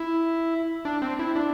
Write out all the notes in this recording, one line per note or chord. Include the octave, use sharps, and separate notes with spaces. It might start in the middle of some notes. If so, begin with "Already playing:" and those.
Already playing: E4
D4
C4
E4
D4